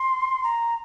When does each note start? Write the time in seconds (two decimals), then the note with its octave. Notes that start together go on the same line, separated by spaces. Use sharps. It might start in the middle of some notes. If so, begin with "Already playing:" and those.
Already playing: C6
0.43 A#5